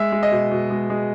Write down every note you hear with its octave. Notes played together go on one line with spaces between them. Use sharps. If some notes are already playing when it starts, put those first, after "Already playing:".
Already playing: G#3 E5
G#3
D#5
B2
B2
G#3
G#3